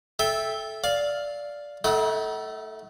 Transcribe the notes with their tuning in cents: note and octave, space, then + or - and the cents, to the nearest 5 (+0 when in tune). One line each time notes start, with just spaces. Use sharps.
A4 -15 E5 +0 G5 +20
D5 -10 F5 +0
A3 +0 D#4 +45 F#5 +30